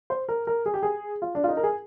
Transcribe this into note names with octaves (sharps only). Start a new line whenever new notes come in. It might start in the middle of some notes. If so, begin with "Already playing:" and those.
C5
A#4
A#4
G#4
G4
G#4
F4
D4
F4
D#4
A#4
G#4